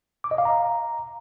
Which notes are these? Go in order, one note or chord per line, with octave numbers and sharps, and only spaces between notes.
D6
D#5
F5
A#5